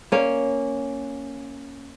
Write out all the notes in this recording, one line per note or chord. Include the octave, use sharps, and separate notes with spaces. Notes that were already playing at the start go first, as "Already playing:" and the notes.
A#3 C#4